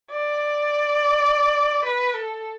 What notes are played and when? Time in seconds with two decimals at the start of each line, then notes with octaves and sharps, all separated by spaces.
0.11 D5
1.85 B4
2.14 A4